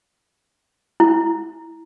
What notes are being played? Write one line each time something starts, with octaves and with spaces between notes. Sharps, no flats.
E4